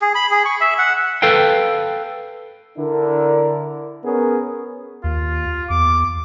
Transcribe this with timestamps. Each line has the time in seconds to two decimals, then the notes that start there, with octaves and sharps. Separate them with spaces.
0.02 G#4
0.15 B5
0.31 G#4
0.45 C#6
0.61 E5
0.78 F#5
1.22 A4 B4 F5 G5
2.78 D3 D4 E4 A#4
4.04 B3 C#4 G#4 A#4
5.04 D#2 F4
5.70 E2 D6